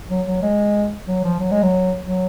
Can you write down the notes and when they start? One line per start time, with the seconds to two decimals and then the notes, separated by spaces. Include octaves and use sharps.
0.10 F#3
0.27 F#3
0.42 G#3
1.07 F#3
1.24 F3
1.39 F#3
1.51 G#3
1.62 F#3
2.05 F#3